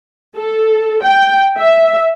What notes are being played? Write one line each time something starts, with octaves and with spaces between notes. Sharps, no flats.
A4
G5
E5